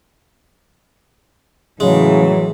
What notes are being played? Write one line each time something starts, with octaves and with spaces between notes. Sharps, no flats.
A2 C#3 E3 F#3 G#3